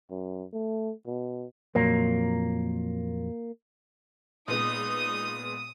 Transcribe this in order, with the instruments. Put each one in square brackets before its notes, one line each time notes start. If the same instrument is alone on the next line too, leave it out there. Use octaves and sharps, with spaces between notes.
[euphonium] F#2
A3
B2
[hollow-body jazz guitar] F2 A#2 F#3 [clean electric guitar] A#3
[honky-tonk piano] A#2 G#3 B3 [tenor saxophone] D#4 [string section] D#6